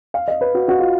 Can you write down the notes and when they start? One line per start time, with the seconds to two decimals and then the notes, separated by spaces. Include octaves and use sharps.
0.14 F5
0.28 D#5
0.41 B4
0.55 F#4
0.68 F#4
0.79 F4